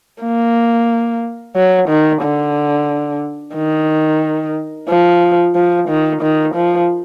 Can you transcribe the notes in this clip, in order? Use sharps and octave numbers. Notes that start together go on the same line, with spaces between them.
A#3
F#3
D#3
D3
D#3
F3
F3
D#3
D#3
F3